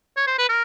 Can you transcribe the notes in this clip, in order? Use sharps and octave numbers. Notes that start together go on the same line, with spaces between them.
C#5
C5
B4
A#4